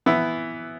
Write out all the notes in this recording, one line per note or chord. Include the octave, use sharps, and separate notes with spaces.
E3 B3 E4